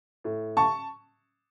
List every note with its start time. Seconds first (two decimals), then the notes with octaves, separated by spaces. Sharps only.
0.24 A2
0.57 A5 C#6